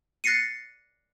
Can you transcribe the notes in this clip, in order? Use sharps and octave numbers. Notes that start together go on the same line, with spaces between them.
F#6 A6 A#6 C7 C#7 D#7